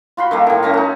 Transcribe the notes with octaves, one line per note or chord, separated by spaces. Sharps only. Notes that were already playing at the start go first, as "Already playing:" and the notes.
F4 F#4 B5 C6
D#3 A3 A#3
A2 D#3
A3 C#4 A#5
D#4 F#4